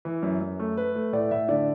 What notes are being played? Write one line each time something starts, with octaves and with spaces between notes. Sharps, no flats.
E3
F#2
F#2
A3
A3 B4
A3
A2 D5
A2 E5
D3 D5